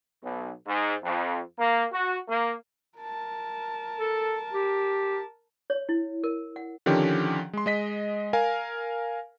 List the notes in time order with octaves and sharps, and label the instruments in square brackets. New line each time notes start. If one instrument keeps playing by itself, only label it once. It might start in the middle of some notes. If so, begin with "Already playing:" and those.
[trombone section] B1
G#2
F2
A#3
F#4
A#3
[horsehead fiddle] A#4 A5
[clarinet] A4
G4
[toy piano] C#5
E4
A#4
F#5
[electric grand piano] D3 D#3 F3 C#4 G4
G#3 C6
G#3 D#5 B6
A#4 F5 G#5